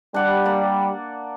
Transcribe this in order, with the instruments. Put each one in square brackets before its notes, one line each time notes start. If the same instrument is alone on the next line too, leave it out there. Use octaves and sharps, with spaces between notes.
[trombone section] G3 [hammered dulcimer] D4 F#5 D6
[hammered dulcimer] A#3 D5